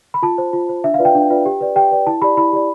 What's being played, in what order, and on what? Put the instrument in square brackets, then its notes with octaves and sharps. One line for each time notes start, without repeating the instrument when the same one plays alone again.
[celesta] B5
F4 A5
C5
F4
C5
D4 E5
F5
F4 B4 D5
G5
D4
F4 B4 D5
G4
B4 D5
G4 G5
B4 D5
E4 A5
G4 D5 B5
E4 B5
G4 D5